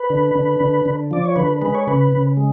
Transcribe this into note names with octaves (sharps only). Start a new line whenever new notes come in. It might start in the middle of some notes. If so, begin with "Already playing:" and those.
Already playing: B4
D3
D3
D3
D3
F3 D5
C#5
D3 B4
G#3 B4
C#5
C#3 B4
C#3
G#3